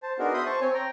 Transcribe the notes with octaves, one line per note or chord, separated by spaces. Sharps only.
C5 A5
B3 D4 D#4 F#4 G#4 A#4
E5 B5 C6 D#6 G6
C5 A5 C#6
C4 C#5 G#5
G5 A#5